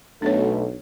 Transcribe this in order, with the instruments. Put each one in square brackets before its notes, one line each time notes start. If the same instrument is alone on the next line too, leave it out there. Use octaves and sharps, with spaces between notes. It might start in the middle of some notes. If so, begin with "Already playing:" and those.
[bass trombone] B1 [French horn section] B2 A3 A4 [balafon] D4 C#5